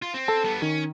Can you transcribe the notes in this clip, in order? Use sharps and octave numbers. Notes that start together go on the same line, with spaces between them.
F4
C4
A4 A5
G3 B3
D#3 C#4